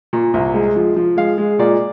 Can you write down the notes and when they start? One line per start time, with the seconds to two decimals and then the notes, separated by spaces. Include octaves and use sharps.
0.13 A#2
0.34 C2
0.54 G#3
0.76 F3
0.96 F3
1.17 G#3 F5
1.38 G#3
1.59 A#2 D5